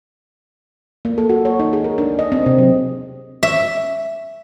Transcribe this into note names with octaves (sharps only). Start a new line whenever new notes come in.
A#3
A4
F#4
C#5
D#4
G#4
A#4
D4
D#5
C4
C3
F#3
E5